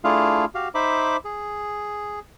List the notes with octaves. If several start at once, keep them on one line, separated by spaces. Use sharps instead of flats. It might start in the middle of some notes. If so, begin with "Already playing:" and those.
A3 D4 E4 F4 G#4 F5
F#4 G4 F5
D#4 C5 E5 B5 D6
G#4